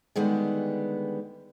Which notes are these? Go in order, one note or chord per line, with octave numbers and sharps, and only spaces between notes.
D3 D#3 G3 G#3 B3